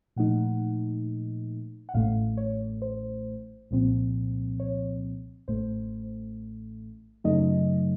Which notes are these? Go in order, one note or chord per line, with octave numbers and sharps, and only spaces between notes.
A#2 F3 A3 D#4 F#5
F#5
A1 A2 A3 F5
C#5
C5
C2 A#2 F3 C4
C#5
A1 A2 A3 C5
F#2 C#3 F#3 A3 D#4 D#5